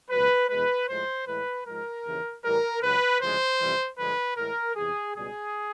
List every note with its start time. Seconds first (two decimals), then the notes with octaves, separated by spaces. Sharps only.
0.11 C#2 B2 F#3 B4
0.49 E2 B2 G#3 B4
0.88 A2 F3 G#3 C5
1.27 A2 E3 G#3 B4
1.66 G#2 F3 G#3 A#4
2.05 D#2 C#3 E3
2.44 A2 E3 G3 A#4
2.82 C#2 C#3 F#3 B4
3.21 D2 C#3 F3 G#3 C5
3.60 F2 C3 E3 G3
3.98 G2 D3 F3 G#3 B4
4.37 A2 E3 G#3 A#4
4.76 E2 C3 E3 G#4
5.15 C#2 B2 G3 G#4